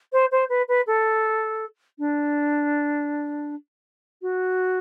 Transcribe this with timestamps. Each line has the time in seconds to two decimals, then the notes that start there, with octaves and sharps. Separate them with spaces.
0.12 C5
0.31 C5
0.49 B4
0.68 B4
0.87 A4
1.99 D4
4.22 F#4